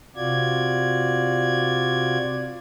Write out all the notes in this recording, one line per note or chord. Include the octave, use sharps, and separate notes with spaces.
C3 F4 F#4 D5 G#6